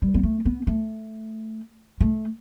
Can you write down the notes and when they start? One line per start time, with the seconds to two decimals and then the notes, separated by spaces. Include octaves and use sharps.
0.02 G3
0.14 B3
0.23 A3
0.45 B3
0.67 A3
2.01 A3